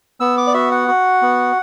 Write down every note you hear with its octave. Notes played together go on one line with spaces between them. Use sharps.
B3 E6
D6
D5
F#4 E5
F#5
F#4
B3